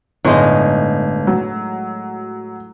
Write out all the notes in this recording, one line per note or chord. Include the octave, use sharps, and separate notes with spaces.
G1 A2 G#3 D#4
F#3